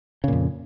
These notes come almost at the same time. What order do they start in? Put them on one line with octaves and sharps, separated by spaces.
C#3 A#2 F2